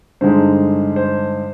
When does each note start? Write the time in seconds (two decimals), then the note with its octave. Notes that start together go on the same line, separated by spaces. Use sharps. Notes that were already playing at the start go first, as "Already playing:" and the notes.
0.21 G2 D3 G#3 D#4 C5
0.96 C5